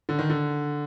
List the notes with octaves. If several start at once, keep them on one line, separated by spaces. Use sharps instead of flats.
D3
D#3
D3